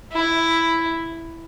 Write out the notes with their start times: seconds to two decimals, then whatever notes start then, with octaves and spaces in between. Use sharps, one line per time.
0.13 E4